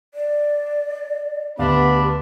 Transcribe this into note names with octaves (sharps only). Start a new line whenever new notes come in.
D5
D2 B3 D4 G4 F5 B5